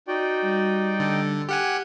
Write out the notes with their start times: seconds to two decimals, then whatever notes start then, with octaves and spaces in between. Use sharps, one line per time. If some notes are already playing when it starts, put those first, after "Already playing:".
0.08 D#4 F#4 D5 G5
0.42 G3
1.00 D3 A4
1.49 G4 F#5 G#5 F6